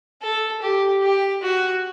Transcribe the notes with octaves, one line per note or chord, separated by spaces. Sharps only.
A4
G4
G4
F#4